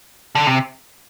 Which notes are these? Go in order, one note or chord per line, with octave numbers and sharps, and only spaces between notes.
D3
C3